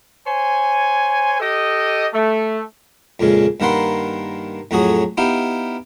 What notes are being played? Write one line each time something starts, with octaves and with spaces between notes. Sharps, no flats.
C5 C#5 G#5
G4 A4 D#5
A3
F2 A#2 C#3 G#3
G2 D#3 A#3 B4 F#5 C6
F2 A2 F#3 F#4 G#4 D#6
B3 D#4 E4 G4 F5